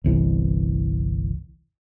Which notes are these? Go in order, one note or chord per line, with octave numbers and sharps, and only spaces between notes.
G1 C2 E3